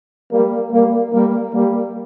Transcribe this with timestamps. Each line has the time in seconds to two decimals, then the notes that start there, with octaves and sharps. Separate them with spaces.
0.31 G3 A#3
0.72 G3 A#3
1.13 G3 A#3
1.53 G3 A#3